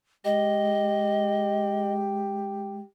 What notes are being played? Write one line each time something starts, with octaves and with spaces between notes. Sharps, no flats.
G#3 G4 D#5